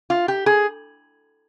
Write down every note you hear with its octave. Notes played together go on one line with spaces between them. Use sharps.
F4
G4
G#4